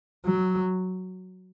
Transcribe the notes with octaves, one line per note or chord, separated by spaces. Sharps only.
F#3